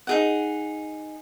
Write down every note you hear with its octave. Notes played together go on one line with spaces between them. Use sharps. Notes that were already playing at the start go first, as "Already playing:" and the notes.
D#4 G#4 F#5